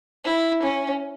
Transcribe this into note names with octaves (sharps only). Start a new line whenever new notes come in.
E4
C#4